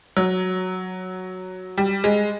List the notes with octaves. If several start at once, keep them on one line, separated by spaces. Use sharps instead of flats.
F#3
G3
G#3